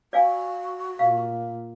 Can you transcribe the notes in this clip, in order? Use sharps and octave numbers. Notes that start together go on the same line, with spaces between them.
F#4 D5 F5 G#5
A#2 F5